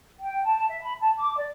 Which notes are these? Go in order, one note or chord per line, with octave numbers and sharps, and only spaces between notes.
G5
A5
E5
B5
A5
D6
D5